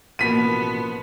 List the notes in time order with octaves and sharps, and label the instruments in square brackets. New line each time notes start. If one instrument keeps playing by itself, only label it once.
[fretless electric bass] A1 B2 [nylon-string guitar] F3 A#3 [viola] B3 [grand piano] B6 D#7